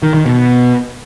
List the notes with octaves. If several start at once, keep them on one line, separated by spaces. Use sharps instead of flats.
D#3
D#3
B2